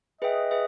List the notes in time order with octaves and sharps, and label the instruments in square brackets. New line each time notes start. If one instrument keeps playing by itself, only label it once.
[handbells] G#4 B4 E5 G5 [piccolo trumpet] D#5
[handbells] G#4 B4 E5